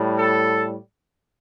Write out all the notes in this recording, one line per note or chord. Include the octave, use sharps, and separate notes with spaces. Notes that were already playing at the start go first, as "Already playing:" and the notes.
Already playing: A2 G3
A4